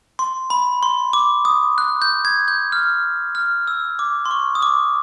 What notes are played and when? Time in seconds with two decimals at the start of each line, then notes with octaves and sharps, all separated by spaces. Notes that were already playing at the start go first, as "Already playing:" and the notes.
0.19 C6
0.50 B5
0.83 C6
1.13 D6
1.45 D#6
1.78 F#6
2.02 G6
2.25 G#6
2.48 G6
2.72 F6
3.35 F6
3.68 E6
3.99 D6
4.25 C6
4.31 C#6
4.55 D#6
4.62 D6